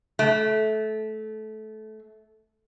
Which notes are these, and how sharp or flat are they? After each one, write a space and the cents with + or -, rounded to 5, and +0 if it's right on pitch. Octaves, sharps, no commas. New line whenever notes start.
A3 -20